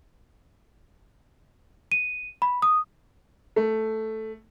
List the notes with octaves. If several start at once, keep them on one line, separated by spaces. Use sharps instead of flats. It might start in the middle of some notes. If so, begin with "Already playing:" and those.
D#7
B5
D#6
A3